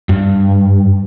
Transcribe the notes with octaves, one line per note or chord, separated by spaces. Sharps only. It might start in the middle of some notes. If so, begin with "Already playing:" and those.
G2